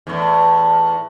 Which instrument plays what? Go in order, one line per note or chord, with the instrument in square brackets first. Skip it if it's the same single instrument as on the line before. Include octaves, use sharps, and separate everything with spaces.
[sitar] E2 A2